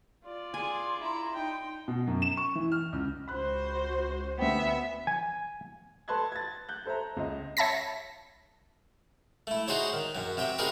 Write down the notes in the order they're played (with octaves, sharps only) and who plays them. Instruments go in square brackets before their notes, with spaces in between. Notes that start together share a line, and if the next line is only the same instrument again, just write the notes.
[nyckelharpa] F4 D5
[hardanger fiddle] G#4 [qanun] G#5 [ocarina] C6
[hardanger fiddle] E4 A#5
[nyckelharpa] D#4 [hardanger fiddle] G5
[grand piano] B2
F#2
E7
C#6
E3
F6
C#2
[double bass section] C#2 [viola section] F#4 C5 [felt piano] B5 F#6
[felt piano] D2 C5 G5 [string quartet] B3 E5
[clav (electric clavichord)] G#5
[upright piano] A4 B4 A5 C6 F#6 G#6
G#6 A6
F#6 G6
A4 C5 E5 A#5
C#2 D#5
[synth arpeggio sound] C#5 E5 A5 B5 A#6 B6
[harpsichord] A3 E4
D#4 F#4 G#4 C5 C#5
D#3
F#2 F#3
C3 F#3 E5 G5
C4 D#4 F#4 G#4 A#4 B4